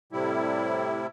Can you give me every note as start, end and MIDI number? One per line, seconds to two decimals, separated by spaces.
0.12 1.07 45
0.12 1.07 48
0.12 1.07 55
0.12 1.07 64